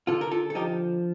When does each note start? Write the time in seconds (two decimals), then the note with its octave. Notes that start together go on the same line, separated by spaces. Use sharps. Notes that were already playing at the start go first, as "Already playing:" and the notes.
0.07 D3 F4 A4
0.21 A#4
0.31 F4 A4
0.50 A4
0.55 F3 D#4 G4